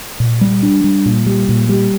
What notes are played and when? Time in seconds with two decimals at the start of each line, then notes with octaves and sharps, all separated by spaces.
0.20 A#2
0.41 G3
0.63 D4
0.84 G3
1.06 A#2
1.26 G3
1.49 A#2
1.69 G3